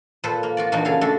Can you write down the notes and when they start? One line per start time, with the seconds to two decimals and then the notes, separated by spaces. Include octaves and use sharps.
0.24 A#2 A4 B4 C5 A5
0.43 A#3
0.57 F4 F#4 D5
0.72 A#2 E3 A#3 D4 D#4 F#4
0.85 C#3 B3 G#4 A4 F5
1.01 A3 D4 F#4 A4